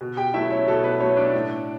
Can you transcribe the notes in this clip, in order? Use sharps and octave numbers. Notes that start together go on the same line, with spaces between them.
B2
G4 G5
F#3 A3 E4 E5
C#4 C#5
B2 A4
B4
F#3 A3 C#4 C#5
D4 D5
A2